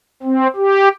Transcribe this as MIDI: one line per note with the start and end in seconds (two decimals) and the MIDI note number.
0.23 0.47 60
0.56 0.88 67